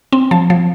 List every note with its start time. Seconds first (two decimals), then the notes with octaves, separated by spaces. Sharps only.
0.12 C4
0.31 F3 A5
0.50 F3